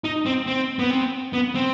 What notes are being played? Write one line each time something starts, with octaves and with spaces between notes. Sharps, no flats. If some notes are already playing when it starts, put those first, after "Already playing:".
D#4
C4
C4
B3
C4
B3
C4